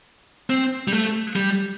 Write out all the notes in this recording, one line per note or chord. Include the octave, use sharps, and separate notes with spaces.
C4
G3
A3
G3